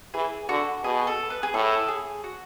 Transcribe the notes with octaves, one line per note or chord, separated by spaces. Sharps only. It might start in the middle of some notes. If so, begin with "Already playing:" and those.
E3 G#4
D3 F#4
B2 G#4
A4
B4
G#4
A2 A4
G#4
F#4